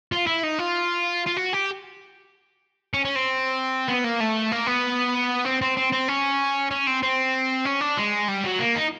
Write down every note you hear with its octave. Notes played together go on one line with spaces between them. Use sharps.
F4
E4
D#4
F4
F4
F#4
G4
C#4
C#4
C4
B3
A#3
A3
A#3
B3
C4
C4
C4
C4
C#4
C#4
C4
C4
C#4
D4
G#3
G3
F#3
A#3
D#4